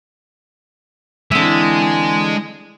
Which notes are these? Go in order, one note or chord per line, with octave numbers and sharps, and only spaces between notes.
D3 E3 G#3 C4 E5